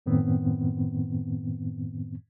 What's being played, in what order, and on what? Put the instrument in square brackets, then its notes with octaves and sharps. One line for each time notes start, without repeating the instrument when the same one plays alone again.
[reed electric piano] F#2 A2 D#3 B3 C4